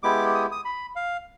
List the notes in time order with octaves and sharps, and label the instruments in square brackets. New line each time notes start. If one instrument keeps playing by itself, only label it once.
[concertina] G#3 B3 E4 G4 D6
D#6
D#6
B5
F5